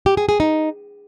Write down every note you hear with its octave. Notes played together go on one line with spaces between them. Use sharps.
G4
G#4
G#4
D#4